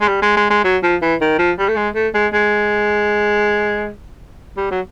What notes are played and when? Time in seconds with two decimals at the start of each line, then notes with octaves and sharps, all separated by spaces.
0.01 G#3
0.08 G3
0.22 G#3
0.36 G#3
0.50 G#3
0.64 F#3
0.83 F3
1.02 E3
1.21 D#3
1.39 F3
1.58 G3
1.68 A3
1.76 G#3
1.95 A3
2.14 G#3
2.33 G#3
4.57 G3
4.71 F#3